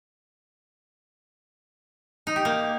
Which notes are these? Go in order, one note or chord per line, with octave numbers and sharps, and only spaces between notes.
D#4
G4
A#3